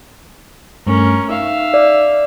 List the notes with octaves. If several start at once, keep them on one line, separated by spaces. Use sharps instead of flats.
G2 A3 C#4 A#4
D#4 E5 F5
D5